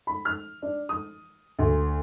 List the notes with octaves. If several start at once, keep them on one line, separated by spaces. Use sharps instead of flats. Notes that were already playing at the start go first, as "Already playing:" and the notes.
B5
F6
D4
D#6
D2